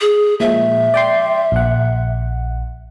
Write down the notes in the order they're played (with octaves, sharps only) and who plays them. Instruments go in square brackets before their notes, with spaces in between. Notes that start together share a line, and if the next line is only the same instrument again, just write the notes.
[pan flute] G#4
[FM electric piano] A#2 F3 G#3 [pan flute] E5
[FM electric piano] D5 G5 C6
A#1 F#5